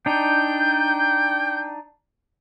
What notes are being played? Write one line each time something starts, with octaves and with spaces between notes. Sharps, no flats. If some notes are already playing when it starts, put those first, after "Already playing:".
D4 D#4 G5 G6